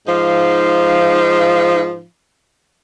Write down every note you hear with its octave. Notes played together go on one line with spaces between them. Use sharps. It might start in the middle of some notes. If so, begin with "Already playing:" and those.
G#2 F3 D#4 F5